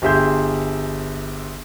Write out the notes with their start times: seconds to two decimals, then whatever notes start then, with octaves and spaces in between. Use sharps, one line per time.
0.02 G1 G4 G#4 E5 C6 G6